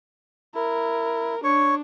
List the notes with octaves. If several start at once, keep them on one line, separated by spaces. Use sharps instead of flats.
E4 A#4
D4 C#5 C#6